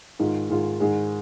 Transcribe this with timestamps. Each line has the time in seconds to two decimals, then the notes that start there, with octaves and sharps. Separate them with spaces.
0.19 G#2 D#3 G#3 F4
0.50 G#2 D#3 G#3 F4
0.80 G#2 D#3 G#3